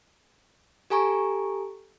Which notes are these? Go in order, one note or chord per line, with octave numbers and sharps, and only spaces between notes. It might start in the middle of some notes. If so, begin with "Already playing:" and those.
G4 A4 G#5 A#5 C#6